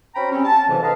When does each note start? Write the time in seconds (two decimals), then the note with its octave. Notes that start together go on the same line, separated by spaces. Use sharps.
0.15 C4 C#4 F#4 G5 A#5 B5
0.32 G3 C4 C#4
0.44 A5
0.68 F2 G#2 C3 E3 F#3
0.82 A4 B4 D#5 F5 A5 A#5